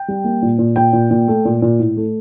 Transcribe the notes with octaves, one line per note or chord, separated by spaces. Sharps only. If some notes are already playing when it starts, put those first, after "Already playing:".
Already playing: G5
G3
A#3
A#2
A#2
A#2 G5
A#2
A#2
A3
A#2
A#2
A2
A3